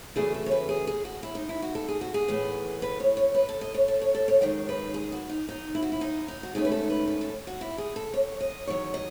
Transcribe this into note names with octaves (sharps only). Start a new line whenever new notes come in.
E2 C#3 F#3 A3 G#4
A4
C#5
B4
G#4
G#4
F#4
E4
D#4
E4
F#4
A4
G#4
F#4
G#4
A2 E3 B3
B4
C#5
C#5
B4
A4
D#5
C#5
A4
C#5
A4
C#5
F#2 D#3 G#3 C#5
B4
G#4
F#4
D#4
D#4
E4
F#4
E4
D#4
D#4
F#4
G#2 D#3 A3 C#4 G#4
B4
A4
B4
B4
A4
F#4
E4
G#4
A4
C#5
D#5
E2 D#3 F#3 C#5
D#5